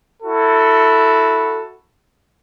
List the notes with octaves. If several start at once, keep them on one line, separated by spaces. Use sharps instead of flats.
E4 F#4 A4